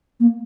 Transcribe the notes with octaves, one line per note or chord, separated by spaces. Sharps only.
A#3